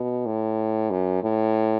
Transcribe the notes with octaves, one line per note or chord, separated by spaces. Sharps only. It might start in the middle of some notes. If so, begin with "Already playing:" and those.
Already playing: B2
A2
F#2
A2